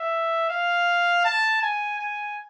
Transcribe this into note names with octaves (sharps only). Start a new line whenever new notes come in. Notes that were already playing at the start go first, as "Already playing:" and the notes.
Already playing: E5
F5
A5
G#5
G#5